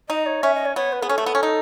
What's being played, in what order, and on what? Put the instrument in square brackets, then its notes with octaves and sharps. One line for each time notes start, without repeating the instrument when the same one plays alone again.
[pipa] D#4 [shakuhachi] D#5
[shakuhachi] C#5
[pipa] C#4 [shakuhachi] E5
[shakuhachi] D#5
C#5
[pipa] B3 [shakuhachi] C#5
[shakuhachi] B4
[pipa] B3 [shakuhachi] G#4
[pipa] C#4 [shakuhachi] A4
[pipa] A3
B3
C#4
D#4